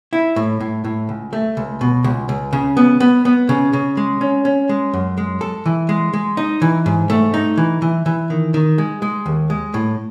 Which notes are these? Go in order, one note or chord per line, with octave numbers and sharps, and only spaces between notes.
E4
A2
A2
A2
C#2
A3
C#2
B2
C#2
C#2
C#3
B3
B3
B3
C#3
C#3
G#3
C#4
C#4
G#3
F#2
G#3
A4
E3
G#3
G#3
D#4
E3
G#2
A3
D#4
E3
E3
E3
D#3
D#3
G#3
G#3
D#2
G#3
A2